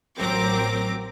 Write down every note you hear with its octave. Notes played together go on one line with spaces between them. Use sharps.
A1 F#3 C4 A#4 D6 A#6